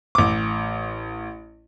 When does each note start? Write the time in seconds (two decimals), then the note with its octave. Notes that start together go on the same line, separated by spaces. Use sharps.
0.15 A1 D6